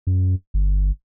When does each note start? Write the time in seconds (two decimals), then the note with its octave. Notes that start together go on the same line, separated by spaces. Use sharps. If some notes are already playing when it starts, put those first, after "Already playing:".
0.07 F#2
0.54 G1